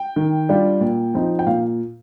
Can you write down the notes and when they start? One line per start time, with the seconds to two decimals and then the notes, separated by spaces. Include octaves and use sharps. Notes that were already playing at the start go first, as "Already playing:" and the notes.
Already playing: G5
0.16 D#3
0.49 G3 D4 F4
0.81 A#2
1.14 F3 C4 D#4
1.39 G5
1.46 A#2 F5